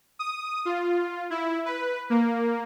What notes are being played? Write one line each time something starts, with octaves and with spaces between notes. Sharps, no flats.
D#6
F4
E4
B4
A#3